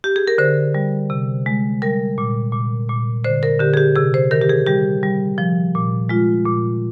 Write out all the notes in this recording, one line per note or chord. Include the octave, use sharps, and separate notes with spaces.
G4
G#4
A#4
D3 C5
G3
C3
G#3
G3 A#4
A#2
A#2
A#2
D3 C5
A#4
D3 G4
G#4
G4
C3 G#4
C5
D#3 A#4
G4
G#4
G3 G4
G3
F3
A#2
G#3 F4
A#2